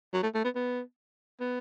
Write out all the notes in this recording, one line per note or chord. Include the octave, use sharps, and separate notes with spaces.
F#3
A3
A3
B3
B3
B3